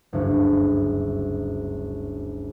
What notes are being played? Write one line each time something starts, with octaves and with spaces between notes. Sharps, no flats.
F#1 D2 G2